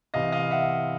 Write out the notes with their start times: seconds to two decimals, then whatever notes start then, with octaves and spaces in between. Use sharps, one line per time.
0.14 C2 C3 E3 D#5 F5
0.32 D#5 F5
0.51 E5 F#5